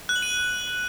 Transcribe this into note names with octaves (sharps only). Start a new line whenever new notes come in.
F#6
F#7
D#7